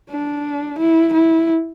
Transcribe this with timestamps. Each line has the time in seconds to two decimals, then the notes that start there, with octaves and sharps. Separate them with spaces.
0.10 D4
0.79 E4
1.14 E4